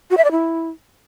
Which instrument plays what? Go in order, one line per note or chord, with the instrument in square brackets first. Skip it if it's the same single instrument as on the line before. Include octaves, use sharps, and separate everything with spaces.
[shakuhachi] F#4
E5
D5
E4